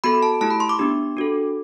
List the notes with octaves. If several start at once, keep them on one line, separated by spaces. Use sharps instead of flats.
B3 F#4 A4 B5
A5
A3 E4 G4 A5
B5
C6
D6
B3 D4 G4
D4 F#4 A4